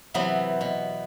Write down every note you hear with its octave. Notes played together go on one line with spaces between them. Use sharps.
C3 E3 F#3 B3 C4
B2